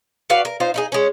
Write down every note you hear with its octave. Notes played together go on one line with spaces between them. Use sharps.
F#4 B4 D5 F5
A#4
D#4 F4 C5
D#4 E4 G#4
G#3 C#4